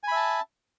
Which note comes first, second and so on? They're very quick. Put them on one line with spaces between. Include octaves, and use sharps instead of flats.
G#5 B5 E5 A5